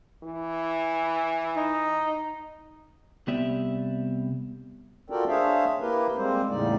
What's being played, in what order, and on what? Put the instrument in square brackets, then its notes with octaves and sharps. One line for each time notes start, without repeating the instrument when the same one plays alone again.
[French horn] E3
[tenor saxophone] D#4
[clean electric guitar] C2 B3 G4 D5 E5
[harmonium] F4 F#4 A4 A#4 D5 G5
D4 G#4 C5 C#5 E5 F5
A#3 E4 G4 A#4 B4
G3 G#3 A#3 C4 C5
E2 A2 C#3 G3 D#4 D5